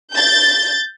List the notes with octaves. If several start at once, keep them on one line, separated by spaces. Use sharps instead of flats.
G6 A6